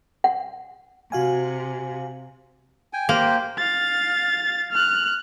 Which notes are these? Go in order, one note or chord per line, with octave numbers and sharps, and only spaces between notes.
F#5
C3 F#4 F5 G#5
G5 G#5
A#3 G4 C5 G5
F5 A6
F6 F#6